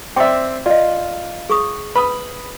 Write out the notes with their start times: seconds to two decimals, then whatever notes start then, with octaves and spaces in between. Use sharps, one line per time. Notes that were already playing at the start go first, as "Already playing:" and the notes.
0.16 C4 D5 E5 G5 C6 D6
0.66 F4 D5 D#5
1.50 G#4 C#6 D#6
1.96 B4 B5 D#6